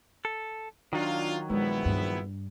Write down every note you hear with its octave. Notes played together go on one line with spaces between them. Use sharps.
A4
D#3 F#3 D4 F4
A#1 G#3 B3 E4
G2 D4